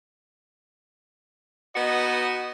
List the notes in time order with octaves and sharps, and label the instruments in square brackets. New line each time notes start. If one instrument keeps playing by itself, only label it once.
[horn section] B3 D#4 F#4 B4 D#5